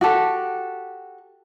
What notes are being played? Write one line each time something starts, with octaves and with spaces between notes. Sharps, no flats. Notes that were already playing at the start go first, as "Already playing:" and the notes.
F#4 G4 A4